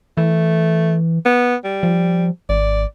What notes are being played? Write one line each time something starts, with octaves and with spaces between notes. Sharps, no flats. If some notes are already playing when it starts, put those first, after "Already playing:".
E3 A3
B3
G3
F3
G#1 D5